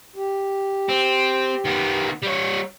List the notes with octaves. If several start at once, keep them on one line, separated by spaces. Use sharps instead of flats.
G4
C4
D#3 B3
G3 C#5